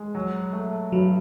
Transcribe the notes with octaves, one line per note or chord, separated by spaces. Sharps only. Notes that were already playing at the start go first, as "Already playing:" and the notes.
Already playing: G#3
F#3
A3
G2 F#3